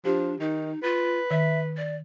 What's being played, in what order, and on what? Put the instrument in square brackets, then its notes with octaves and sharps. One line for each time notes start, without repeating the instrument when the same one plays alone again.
[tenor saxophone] F3 [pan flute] D4 [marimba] G4
[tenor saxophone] D#3 [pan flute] D#4
[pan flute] F4 [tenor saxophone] B4
[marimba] D#3 [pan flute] E5
[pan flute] D5